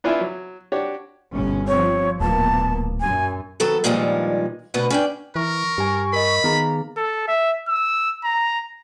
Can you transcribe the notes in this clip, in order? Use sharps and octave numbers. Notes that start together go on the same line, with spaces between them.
B3 D4 E4 F4 E5 G#5
F#3
D4 F#4 G4 C#5
G1 B2 C#4
F3 C4 C#5
D1 A#2 A#3 B3 A5
F#2 G#5
D#3 F#3 B3 A4 C5
G2 A#2 D#3 F3 G3 G#3
D2 B2 B3 B4
C#4 D4 G5
E3 A#4 C#6
G2 G4 G#5
A#4 D#5 B5
D#3 B3 G#4 A#5
A4
E5
E6
A#5